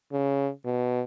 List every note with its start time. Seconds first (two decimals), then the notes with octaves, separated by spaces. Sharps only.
0.12 C#3
0.65 B2